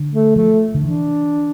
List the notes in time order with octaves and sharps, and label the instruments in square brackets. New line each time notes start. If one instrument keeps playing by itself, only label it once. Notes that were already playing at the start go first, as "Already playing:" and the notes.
Already playing: [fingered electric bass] D3
[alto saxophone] A3
[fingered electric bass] F3 [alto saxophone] A3
[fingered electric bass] D3
[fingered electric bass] E3 [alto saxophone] D4